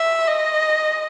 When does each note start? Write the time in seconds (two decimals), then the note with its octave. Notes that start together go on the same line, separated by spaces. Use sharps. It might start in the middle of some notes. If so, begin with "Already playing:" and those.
Already playing: E5
0.27 D#5